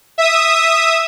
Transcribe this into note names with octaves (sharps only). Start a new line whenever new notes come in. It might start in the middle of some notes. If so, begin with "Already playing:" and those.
E5 D#6